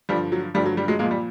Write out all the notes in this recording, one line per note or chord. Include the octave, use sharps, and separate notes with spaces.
G2 D3 F3 G3
F#3
G2 D3 F3 G3
F#3
G3
F#3 G#3
A#2 F3 G#3 A#3
G3